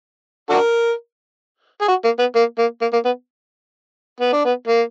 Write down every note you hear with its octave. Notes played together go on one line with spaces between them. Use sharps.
D4 F#4 A#4
G#4
F#4
A#3
B3
A#3
A#3
A#3
A#3
B3
B3
D4
B3
A#3